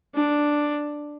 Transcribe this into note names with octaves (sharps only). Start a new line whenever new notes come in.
D4